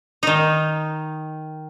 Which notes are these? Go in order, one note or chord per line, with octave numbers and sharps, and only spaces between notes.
D#3 D#4